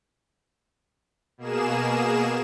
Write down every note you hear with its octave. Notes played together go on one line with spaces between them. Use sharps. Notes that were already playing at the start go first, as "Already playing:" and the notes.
B2 A#3 G#4 E7